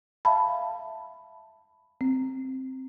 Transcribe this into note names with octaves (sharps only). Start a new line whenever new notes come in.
E5 F5 A5 B5
C4